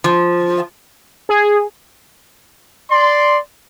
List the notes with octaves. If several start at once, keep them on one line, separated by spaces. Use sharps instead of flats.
F3
G#4
D5 C6